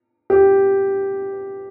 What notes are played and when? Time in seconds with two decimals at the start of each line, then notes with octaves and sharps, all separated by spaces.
0.30 G4